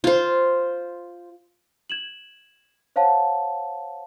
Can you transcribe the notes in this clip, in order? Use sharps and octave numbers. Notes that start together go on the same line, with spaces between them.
F4 C5
G#6 E7 F#7
C5 C#5 F5 F#5 A5